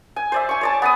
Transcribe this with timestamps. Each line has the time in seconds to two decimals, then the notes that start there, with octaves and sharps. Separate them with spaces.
0.16 G#5
0.32 C5 D5 E5
0.49 G#5 C#6
0.61 C#5 D5 A5
0.82 B3 G#5 D#6